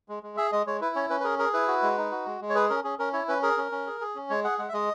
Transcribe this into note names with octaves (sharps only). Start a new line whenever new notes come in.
G#3
G#3
G#4 E5
G#3 D#5
G#3 C#5
E4 B4
C#4 C#5
C#4 B4
B4
G#4 A#4
G#4 A#4
E4 B4
F#4
G#3
D#4
F#4
G#3
G#3
C#5
G#4 B4
C#4 A#4
C#4 G#4
C#4 A#4
E4 C#5
C#4 B4
G#4 A#4
C#4
C#4
G#4
G#4
C#4
G#3 C#5
G#4 F#5
G#3 F#5
E5
G#3 D#5